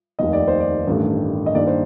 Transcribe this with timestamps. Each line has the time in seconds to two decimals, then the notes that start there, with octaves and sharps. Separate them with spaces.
0.19 F1 D#2 D#3 D#5
0.33 D5
0.47 C5
0.60 D5
0.87 A1 G2 D#3 A3
1.46 D#5
1.54 G2 D#3 A#3 D5
1.67 C5